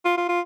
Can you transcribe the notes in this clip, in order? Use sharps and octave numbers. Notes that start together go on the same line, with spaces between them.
F4
F4
F4